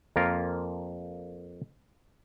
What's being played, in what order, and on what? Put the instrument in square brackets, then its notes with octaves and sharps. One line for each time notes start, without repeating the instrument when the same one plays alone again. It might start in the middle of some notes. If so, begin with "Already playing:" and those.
[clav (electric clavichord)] F2 A#3 F4 A#4